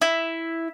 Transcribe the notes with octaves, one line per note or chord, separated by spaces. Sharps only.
E4